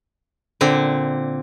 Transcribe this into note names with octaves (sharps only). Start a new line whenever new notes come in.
A#2 D3 C4